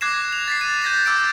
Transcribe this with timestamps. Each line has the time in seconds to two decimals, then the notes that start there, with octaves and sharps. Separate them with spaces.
0.01 D6 F#6 G#6 A#6 C7 E7
0.33 F7
0.48 A6 B6 C7
0.61 D#7
0.82 G6 G#6 A#6 D#7 E7
1.06 D6 E6 G6 A6 D7